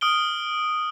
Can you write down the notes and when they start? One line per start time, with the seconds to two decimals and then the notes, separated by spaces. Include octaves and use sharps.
0.01 D#6 F6 D7 G7